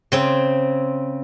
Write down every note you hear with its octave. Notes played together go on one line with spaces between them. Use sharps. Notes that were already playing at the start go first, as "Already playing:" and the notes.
C#3 C4